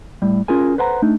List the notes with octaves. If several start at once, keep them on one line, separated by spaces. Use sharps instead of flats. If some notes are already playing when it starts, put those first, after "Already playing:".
A2 G3
C#4 F4 G#4 A#4 G#5
A4 B4 C5 F#5 A5 A#5
A3 D4 D#4